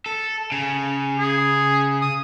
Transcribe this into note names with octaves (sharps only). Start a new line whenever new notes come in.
A4
C#3
G#4
D#6